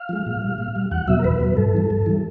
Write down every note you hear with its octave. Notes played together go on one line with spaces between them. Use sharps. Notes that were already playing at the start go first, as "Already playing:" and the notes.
Already playing: F5
F3 G#3
A#2
G3
A#2
G3
E2 F#5
B2 F#3 E5
A#4
E2 B4
B2 F#3
G2 A4
E3 G3
G2
E3 G3